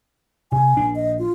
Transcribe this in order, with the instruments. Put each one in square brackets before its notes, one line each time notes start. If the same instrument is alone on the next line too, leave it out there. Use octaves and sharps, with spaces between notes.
[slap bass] C3 [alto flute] G#5
[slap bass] A#1 D4
[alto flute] D#5
F4